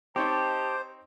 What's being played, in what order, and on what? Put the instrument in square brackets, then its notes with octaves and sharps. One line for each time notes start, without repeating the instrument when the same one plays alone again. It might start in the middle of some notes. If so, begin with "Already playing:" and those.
[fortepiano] C4 D#4 C#5 [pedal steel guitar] G4 [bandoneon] C5 [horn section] D#5 A5